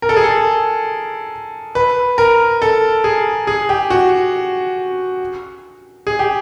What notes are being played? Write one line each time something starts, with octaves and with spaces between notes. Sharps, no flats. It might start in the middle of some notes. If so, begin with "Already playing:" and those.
A#4
A4
G#4
A4
B4
A#4
A4
G#4
G#4
G4
F#4
G#4
G4